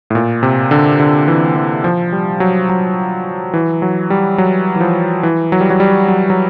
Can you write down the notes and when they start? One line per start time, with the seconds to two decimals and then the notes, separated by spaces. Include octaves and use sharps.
0.10 A2
0.15 A#2
0.43 C3
0.71 D3
1.00 D3
1.28 E3
1.56 E3
1.84 F3
2.12 G3
2.40 F#3
2.69 F#3
3.53 E3
3.82 F#3
4.10 G3
4.38 F#3
4.76 E3
4.80 F3
5.23 E3
5.52 F#3
5.61 G3
5.70 F#3
5.80 G3
6.08 F#3
6.30 F#3